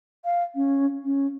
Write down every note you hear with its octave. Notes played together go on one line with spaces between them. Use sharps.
F5
C#4
C#4